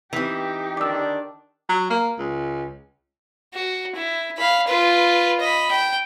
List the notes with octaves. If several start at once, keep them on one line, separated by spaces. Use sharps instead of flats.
E3 C4 D#4 G4
D3 D#3 D4 D6 E6
F#3
A#3
C#2
F#4
E4
F5 B5
F4 B4
D#5 B5
G5